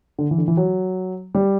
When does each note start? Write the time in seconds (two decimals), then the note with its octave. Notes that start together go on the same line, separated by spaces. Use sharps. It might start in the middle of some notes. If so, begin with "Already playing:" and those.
0.19 D3
0.31 E3
0.38 D3
0.48 E3
0.57 F#3
1.35 G3